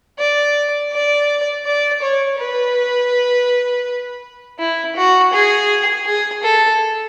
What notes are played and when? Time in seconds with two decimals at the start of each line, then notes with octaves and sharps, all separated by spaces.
0.19 D5
0.92 D5
1.66 D5
2.02 C#5
2.38 B4
4.59 E4
4.95 F#4
5.33 G#4
6.06 G#4
6.43 A4